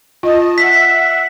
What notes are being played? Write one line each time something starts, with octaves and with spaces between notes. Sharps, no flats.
F4 D#5 A5
E5 F#5 B6